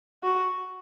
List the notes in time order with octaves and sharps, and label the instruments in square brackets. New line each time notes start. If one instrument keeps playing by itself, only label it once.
[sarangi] F#4